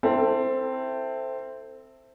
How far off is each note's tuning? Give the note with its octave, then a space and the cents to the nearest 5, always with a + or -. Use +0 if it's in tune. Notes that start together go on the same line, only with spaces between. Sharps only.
C4 +0 E4 +0 A4 +25